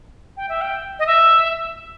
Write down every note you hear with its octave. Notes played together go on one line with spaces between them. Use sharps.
G5
E5
G5
D#5
E5